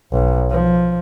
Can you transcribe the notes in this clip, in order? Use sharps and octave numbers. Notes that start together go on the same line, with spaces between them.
B1
F3